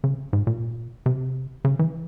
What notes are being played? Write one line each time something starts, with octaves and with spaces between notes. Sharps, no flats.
C#3
G#2
A#2
C3
C#3
E3